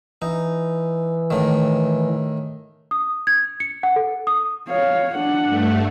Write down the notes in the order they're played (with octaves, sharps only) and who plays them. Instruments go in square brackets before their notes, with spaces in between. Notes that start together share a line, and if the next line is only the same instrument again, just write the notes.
[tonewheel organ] E3 [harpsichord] D#4
[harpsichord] A2 D#3
[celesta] D#6
G#6
C#7
F#5
A4
D#6
[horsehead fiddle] C#5 F5
D4 F#5
[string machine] G2 A3